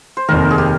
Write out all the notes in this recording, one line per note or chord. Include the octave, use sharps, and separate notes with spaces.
C5
F1 D#2 D#3 A#4
G#4
G4